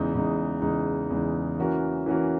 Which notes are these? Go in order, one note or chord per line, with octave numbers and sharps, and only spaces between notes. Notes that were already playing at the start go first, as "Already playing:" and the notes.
Already playing: E2 C#3 G#3 D#4
E2 C#3 G#3 D#4
E2 C#3 G#3 D#4
E2 C#3 G#3 D#4
E3 A#3 C#4 F#4 A#4
E3 A#3 C#4 F#4 A#4